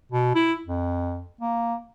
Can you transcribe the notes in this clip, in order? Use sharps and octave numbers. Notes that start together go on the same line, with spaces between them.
B2
E4
F2
A#3